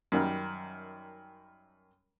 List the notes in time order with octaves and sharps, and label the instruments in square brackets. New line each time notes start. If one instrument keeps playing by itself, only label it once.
[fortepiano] F#2 D#3 G3